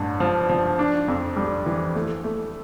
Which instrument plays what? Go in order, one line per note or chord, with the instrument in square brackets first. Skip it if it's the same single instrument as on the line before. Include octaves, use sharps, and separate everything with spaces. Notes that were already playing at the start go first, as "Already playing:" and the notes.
Already playing: [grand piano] A1 G2
F3
F3
D4
F2
G3
E3
A3
A3